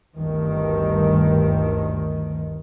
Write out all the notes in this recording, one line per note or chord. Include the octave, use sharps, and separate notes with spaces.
G1 D2 G2 D#3